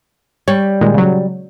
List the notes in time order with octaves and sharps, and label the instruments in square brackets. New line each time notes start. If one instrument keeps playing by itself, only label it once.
[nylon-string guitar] G3 [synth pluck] C#5
[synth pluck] A#2 D#3 G#3
C#3 F#3